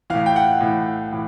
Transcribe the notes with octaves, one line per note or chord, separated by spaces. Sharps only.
A2 E3 F5
G5
F#5
A2 E3
A2 E3